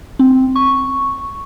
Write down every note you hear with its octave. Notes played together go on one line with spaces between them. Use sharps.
C4
C#6